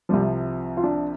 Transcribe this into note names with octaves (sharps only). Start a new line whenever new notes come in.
C2 C3 F3 G3
F4
D4